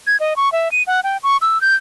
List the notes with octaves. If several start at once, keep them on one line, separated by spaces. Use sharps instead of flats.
G#6
D#5
C#6
E5
D#7
F#5
G5
C#6
E6
G6